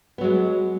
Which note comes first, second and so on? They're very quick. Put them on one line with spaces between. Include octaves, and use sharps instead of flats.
B3 F#3 G#3